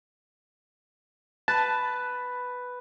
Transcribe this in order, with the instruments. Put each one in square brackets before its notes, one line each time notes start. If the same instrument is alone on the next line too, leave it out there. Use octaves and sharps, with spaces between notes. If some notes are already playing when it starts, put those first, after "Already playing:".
[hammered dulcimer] B4 [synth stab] A5